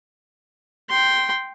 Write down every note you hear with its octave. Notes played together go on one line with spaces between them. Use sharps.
G5 C6